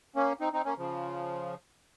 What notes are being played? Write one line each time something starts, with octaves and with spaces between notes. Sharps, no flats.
A#3 C#4
C4 D#4
C4 D#4
A#3 C#4
C#3 F3